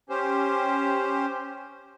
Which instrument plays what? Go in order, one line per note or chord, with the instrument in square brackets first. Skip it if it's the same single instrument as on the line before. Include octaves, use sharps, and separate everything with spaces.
[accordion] C#4 G4 C5